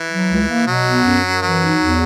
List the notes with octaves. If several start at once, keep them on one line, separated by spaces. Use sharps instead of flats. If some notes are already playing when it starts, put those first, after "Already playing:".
Already playing: E3
F#3
C#2
A#3
B2 F#3
B3
F#2
F#2
E3 F#3
D#4
E2